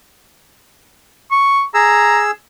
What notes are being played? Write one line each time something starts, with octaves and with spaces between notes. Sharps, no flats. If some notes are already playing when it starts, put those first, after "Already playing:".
C#6
G#4 A#5 E6